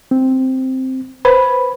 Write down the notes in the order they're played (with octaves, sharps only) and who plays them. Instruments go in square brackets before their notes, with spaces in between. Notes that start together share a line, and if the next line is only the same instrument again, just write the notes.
[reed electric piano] C4
[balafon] B4 C5 [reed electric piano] B5